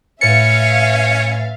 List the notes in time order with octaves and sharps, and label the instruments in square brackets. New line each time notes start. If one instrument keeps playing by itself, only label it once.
[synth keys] A2 B4 A6 [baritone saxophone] C#4 [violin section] E5 F5 [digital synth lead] C#7